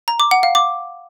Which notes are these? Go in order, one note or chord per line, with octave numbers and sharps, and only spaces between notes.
A#5
D6
F#5
F5
D6